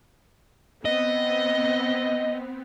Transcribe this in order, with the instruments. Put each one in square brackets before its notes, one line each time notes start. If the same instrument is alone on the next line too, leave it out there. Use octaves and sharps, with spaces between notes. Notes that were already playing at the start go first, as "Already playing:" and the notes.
[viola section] B3 C4 [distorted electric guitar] D#5